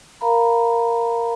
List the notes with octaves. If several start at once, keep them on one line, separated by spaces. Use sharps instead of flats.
A#4 F5 A#5 B5